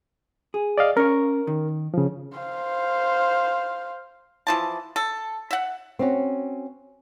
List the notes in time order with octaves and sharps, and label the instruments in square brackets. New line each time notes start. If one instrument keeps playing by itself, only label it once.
[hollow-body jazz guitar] G#4
[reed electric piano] D5 D#5 F5
[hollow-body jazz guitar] C#4 C#5 [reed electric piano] A#4
[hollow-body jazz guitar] D#3
[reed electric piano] C#3 F3
[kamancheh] C5 F5
[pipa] E3 F3 A5
A4
E5 F#5
[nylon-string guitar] C4 C#4 F#4